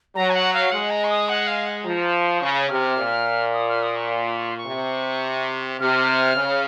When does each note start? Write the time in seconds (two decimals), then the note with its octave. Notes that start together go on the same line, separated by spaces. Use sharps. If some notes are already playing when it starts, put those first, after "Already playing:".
0.15 F#3 A#5
0.30 G#5
0.34 F#5
0.54 F5
0.72 G#3 F#5
0.90 A#5
1.04 C#6
1.09 D#6
1.29 F#5
1.47 F5
1.66 F#5
1.84 F3 A#5
2.22 C6
2.37 D#6
2.41 C#3 C#6
2.70 C3 F6
2.97 A#2
3.54 D#6
3.69 F6
3.83 D#6
3.96 C#6
4.11 C6
4.38 C#6
4.49 C6
4.57 C#6
4.67 C3
5.80 C3 F6
6.35 C#3